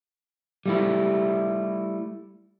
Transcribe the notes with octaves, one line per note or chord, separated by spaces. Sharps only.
G3 A3 E4